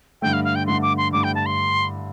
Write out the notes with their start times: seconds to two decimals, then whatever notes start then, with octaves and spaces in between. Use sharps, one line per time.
0.22 G2 D3 A3 G5
0.33 F5
0.44 F5
0.55 G5
0.67 G2 D3 A3 C6
0.82 D6
0.98 C6
1.13 G2 D3 A3 D6
1.24 G5
1.35 A5
1.46 C6